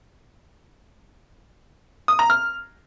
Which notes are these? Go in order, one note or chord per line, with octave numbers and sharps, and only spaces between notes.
D#6
A#5
F6